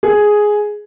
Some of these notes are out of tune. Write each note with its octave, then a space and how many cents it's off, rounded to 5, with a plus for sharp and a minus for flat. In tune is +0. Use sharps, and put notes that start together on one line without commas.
G#4 +5